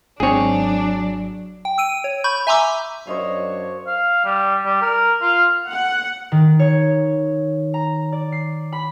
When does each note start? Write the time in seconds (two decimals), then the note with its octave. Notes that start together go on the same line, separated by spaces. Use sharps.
0.20 G#1 F#3 C4 D4 G#4 C#5
1.65 G5
1.78 E6 D7 D#7
2.04 C#5
2.24 B5 C#6 G6
2.47 E5 G#5 A#5 C6 D6 E6
3.07 F#2 D4 C5 C#5 D#5 F5
3.87 F5
4.24 G3
4.65 G3
4.81 A#4
5.22 F4
5.70 F#5
6.32 D#3
6.59 C#5
7.74 A#5
8.12 D5
8.32 C7
8.72 B5